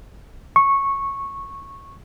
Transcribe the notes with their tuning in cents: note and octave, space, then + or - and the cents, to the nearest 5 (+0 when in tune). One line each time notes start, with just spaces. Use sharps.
C#6 -10